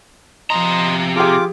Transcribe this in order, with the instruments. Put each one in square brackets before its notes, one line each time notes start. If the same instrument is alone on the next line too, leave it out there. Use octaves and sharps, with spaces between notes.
[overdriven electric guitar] C3 A#5 [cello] F3 [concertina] D#5 C6
[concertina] F4 D6 [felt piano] G4 G#4